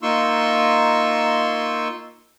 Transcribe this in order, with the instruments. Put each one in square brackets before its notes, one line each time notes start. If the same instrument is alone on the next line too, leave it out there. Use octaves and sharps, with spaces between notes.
[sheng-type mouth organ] A#3 D#4 F4 C6 C#6 E6